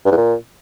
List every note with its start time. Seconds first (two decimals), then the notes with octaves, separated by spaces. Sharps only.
0.05 G2
0.11 E2
0.17 A#2